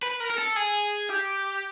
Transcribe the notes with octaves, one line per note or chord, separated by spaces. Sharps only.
B4
A#4
A#4
A4
G#4
G4